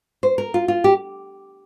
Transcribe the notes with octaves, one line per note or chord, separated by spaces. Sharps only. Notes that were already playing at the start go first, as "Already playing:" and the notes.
C5
A#4
F4
F4
G4